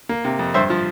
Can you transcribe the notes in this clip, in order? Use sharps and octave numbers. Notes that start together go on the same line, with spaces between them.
A#3
C3
F2
G2 C5 E5
F3